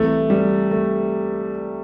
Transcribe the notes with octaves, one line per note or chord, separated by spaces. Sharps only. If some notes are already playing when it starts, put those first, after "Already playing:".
Already playing: C2 C3 E3 A3
G3
A3